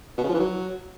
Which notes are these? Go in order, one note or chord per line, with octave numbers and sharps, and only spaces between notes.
B2
C#3
F3
E3
F#3